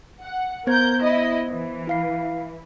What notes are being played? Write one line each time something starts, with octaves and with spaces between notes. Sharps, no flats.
F#5
B3 A#4 C5 G6 G#6
E4 D#5
E3
E4 F5 C7